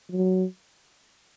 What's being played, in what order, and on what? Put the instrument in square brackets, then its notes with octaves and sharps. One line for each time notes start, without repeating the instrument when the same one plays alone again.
[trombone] F#3